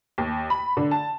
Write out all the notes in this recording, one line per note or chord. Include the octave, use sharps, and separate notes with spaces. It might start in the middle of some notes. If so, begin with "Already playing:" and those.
D#2
B5
D3
A5